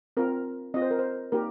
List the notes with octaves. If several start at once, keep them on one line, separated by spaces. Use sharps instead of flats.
C4 F4 A#4
C4 F4 D#5
C5
A#4
C5
A#3 D#4 G4 A#4